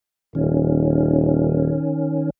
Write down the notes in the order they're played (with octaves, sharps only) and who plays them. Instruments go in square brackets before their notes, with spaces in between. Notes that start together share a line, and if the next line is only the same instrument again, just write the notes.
[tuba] D#1 [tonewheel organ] D#3 C#4